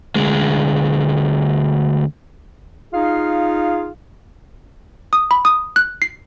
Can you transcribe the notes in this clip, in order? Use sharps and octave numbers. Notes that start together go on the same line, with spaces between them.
D2 G#3
D#4 F4 G#4 F5
D#6
B5
D#6
F#6
C7